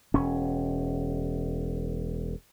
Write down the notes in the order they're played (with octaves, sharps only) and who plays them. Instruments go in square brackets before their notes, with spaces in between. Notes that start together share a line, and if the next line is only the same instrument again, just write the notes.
[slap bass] E1 C#4